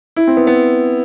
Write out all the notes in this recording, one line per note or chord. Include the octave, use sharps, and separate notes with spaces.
E4
C4
B3
B3